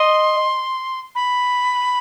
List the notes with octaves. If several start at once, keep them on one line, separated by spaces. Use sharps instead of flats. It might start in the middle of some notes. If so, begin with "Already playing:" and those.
Already playing: D#5 C6
B5